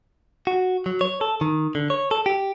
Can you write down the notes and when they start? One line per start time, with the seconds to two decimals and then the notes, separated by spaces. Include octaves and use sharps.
0.47 F#4
0.86 F#3
1.01 C#5
1.21 A4
1.41 D#3
1.75 D3
1.90 C#5
2.11 A4
2.26 G4